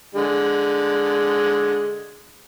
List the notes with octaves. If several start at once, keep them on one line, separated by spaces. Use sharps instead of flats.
D3 G#3